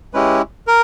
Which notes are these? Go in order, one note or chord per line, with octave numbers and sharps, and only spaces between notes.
G#3 C#4 E4 G4 B4
A#4